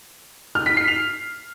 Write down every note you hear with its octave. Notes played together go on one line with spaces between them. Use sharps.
F6
B6
C7
F7